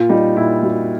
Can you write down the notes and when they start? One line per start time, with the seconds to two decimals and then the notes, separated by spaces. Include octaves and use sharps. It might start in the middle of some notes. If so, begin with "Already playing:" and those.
Already playing: A#2 F4
0.09 G3 D#4
0.36 A#2 E4
0.63 G3 F#4